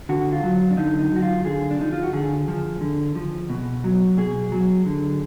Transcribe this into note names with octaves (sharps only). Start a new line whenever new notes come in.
D3 F#4
F4
F#3
D4
D3 D#4
D#4
F#3 F#4
F4
D3 G#4
D4
F3 D#4
F4
F#4
D3 G#4
F3
D3
F3
B2
F#3
B2 G#4
F#3
D3